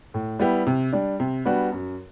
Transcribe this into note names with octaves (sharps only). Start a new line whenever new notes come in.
A2
G3 B3 E4 G4
C3
G3 D4
C3
G3 B3 D4 F#4
F#2